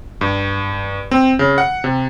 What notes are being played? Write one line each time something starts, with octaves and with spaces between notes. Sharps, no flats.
G2
C4
C#3
F#5
C3